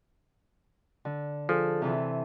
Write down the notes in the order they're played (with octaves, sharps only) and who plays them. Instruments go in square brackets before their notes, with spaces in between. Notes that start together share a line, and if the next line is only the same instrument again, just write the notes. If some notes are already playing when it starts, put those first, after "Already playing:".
[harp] D3
[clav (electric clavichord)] F3 [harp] G#4 A4
[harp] C3 E3 A4